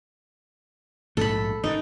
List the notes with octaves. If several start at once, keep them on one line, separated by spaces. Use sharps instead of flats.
A#1 G#2 A3 A4 B5
F#2 D#3 D#4